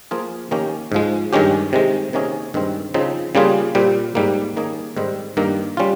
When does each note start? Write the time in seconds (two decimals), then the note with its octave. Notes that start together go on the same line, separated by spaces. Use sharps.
0.11 F3 A#3 F4 G#4
0.51 D#3 A#3 C#4 G4
0.92 G#2 F3 G#3
1.33 G2 D#3 G#3 C#4 G4
1.73 C3 D#3 G#3
2.13 C3 D#3 A#3 C#4 G#4
2.54 G2 D#3 G#3 C4
2.94 C#3 F3 C4 D#4
3.35 C#3 G3 A#3 F4 G#4
3.75 A#2 G3 C4 G4
4.15 G#2 G3 A#3
4.57 D#3 A#3 C#4 G#4
4.97 G#2 D#3 G3 C4
5.37 G2 D#3 A#3
5.77 G3 C#4 F4